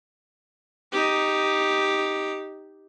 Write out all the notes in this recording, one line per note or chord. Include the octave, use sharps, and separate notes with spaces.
D#4 G4